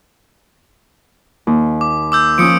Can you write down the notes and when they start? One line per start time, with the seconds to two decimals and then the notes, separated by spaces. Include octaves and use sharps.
1.47 D#2
1.81 D6
2.12 D6 E6 G6
2.38 F3 C#4 D#6 C#7 D7